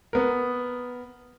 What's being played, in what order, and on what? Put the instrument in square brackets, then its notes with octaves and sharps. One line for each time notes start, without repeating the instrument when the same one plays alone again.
[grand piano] B3 A#4